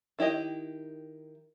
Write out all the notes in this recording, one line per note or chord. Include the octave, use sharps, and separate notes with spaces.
D#3 E4 G4 D#5 G5